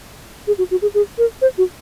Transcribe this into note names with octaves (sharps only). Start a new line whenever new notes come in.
G#4
F#4
F#4
G#4
G#4
A#4
C5
F#4